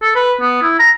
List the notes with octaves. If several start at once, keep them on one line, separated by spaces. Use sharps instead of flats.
A4
B4
B3
E4
A#5